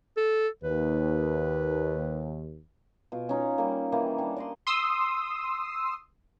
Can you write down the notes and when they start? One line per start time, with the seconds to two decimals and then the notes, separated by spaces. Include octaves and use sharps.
0.17 A4
0.64 D#2 B4
3.12 B2 F4
3.29 C#4 D#4 F4
3.58 G3 A#3
3.92 D#3 E3 A#3 G4
4.18 G3 D4
4.36 D5 D#5 C6
4.67 C6 D#6 E6